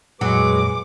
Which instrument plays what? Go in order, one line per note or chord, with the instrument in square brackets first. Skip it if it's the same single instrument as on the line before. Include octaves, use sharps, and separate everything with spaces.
[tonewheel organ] F2 A#2 [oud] F#3 [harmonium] G#3 G#4 B4 [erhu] D6